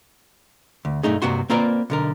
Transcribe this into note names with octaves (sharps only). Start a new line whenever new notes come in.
D2
B1 G2 A3 D#4 G#4
G2 C3 A#3 F#4 C6
A#3 C4 F4 A#4 B4 D5
B1 D3 A#4